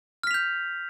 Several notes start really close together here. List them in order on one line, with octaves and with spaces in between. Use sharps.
F6 B6 F7 G6